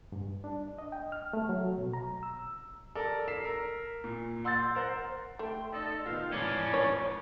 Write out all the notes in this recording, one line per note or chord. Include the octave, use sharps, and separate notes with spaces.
G2
D4
D#5
G5
F6
A3
F#3
B2
A#5
E6
A4 A#4 D5
E6 B6 C7 E7
A#4
A#2
F#5 C6 E6 G6 A6
A#4 C5 F#5
A3 G5 C6
D#4 A4 D5 D#5
D#3 B3 F4 F5
F2 G#2 E3 C#4 D5
C#5